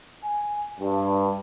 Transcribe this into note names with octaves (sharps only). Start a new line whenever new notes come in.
G#5
G2